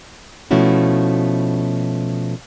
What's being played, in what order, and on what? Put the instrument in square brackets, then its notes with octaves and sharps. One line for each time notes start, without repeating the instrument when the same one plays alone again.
[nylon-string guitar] B2 F3 A3 C#4 E4 F#4